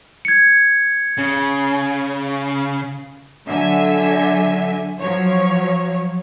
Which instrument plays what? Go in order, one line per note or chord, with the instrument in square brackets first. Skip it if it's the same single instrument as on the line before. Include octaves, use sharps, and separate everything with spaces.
[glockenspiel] G#6 C#7
[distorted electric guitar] C#3
[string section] D3 F#3 E5 G#5
F3 F#3 C#5